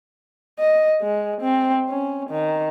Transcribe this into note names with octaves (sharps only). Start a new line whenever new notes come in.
D#5
G#3
C4
C#4
D#3